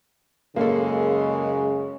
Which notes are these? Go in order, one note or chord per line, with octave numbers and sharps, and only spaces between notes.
F#2 C#3 G#3 A#3 A4